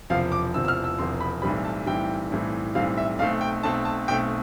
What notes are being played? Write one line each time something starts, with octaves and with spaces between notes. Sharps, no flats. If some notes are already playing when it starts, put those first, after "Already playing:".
E1 E2 C3 F3 F5
D6
E1 E2 C3 F3 E6
E6
F6
E6
E1 E2 C3 F3 C6
B5
B1 A2 E3 G3 C4 B5
A5
B1 A2 E3 G3 C4 G5
B1 A2 E3 G3 C4
B1 A2 E3 G3 C4 F5
E5
B1 B2 A3 C4 F5
G5
B1 B2 A3 C4 A5
A5
B1 B2 A3 C4 G5